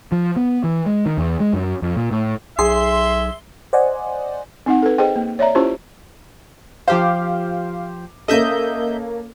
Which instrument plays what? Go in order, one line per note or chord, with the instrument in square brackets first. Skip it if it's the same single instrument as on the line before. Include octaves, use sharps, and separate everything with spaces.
[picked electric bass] F3
B3
E3
G#3
D#3
E2
G#3
F#2
F2
A#2
A2
[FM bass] B1 [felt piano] G#4 [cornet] E5 [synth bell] C6
[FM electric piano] C5 D5 D#5 F#5 G#5
[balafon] C4 D#4 F#5
A4 B4
G#4 C5 D#5 G5
A#3
C#5 D5 E5 A#5
C#4 E4 F4 G4 C5
[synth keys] F3 G4 C5 [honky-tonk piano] F5 D6
[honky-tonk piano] A#3 C#4 A4 [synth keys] D#5 E5 G6